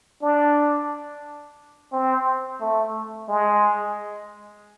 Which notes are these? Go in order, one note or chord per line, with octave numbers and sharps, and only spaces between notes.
D4
C4
A3
G#3